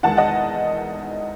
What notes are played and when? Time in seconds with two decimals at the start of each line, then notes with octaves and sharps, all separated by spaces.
0.03 E2 D#3 G#3 F#5 A5
0.17 D#5 F#5